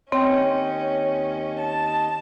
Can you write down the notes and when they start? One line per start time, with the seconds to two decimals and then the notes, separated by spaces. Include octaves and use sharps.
0.12 D#2 C4 C#4 C#5 D#5 G5
1.60 A5